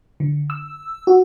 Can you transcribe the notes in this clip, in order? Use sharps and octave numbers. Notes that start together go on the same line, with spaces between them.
D3
E6
F#4